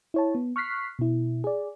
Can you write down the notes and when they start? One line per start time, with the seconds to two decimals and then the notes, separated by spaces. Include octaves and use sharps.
0.14 E4 C#5 A5
0.35 B3
0.56 C#6 F6 F#6 B6 C7
0.99 B2 E4
1.44 G#4 D5